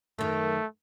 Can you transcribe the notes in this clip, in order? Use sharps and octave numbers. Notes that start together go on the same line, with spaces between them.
F#2 D#3 A3